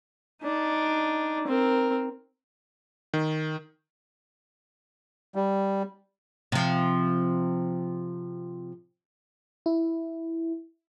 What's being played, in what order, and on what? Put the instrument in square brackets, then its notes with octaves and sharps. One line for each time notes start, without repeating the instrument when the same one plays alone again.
[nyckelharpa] D4 D#4
C4 A#4
[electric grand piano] D#3
[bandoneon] G3
[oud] C3 F3
[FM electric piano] E4